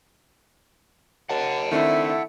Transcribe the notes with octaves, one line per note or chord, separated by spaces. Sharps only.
D#2 F#5 A5
D#3 A3 C4 D4 E4